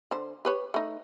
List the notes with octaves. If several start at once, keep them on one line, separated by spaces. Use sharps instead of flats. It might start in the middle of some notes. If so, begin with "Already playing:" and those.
D3 C5
G4 B4 C#5
A3 D#4